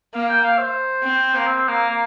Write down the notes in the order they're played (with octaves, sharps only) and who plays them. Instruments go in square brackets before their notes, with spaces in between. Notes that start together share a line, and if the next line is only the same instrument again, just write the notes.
[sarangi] A#3 [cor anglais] F5
[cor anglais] G5
F5
C5
[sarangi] C4
[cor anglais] A#3
C4
A#3
A#3